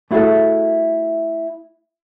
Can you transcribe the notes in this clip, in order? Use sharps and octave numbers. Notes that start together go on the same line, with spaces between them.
A3 E4 F#4 G#4 A4